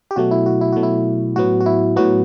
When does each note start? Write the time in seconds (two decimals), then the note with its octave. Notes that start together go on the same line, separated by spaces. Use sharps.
0.11 G4
0.16 B2 F#3 A3 F#4
0.31 E4
0.46 F#4
0.61 E4
0.72 B2 F#3 A3 F#4
0.83 E4
1.36 A2 F#3 B3 F#4
1.60 F#4
1.66 E4
1.96 A2 F#3 B3 F#4